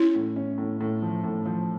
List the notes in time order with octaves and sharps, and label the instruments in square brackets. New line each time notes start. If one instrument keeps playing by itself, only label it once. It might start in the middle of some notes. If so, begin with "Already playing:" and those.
Already playing: [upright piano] C#4 [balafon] E4
[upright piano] A2
C#4
A2
A2
F3
A2
F3